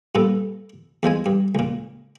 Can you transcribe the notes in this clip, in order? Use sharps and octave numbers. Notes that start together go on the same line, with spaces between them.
G2 A#2 B3 A4
E2 F3 G#3 G#5
G2
C#2 A#2